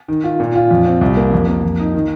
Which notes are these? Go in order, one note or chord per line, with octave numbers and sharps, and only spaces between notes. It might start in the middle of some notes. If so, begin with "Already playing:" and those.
D#3
F4
A#2
F4
F2
C4
C2
A#3
F2
A#3
F2
D#4
D#3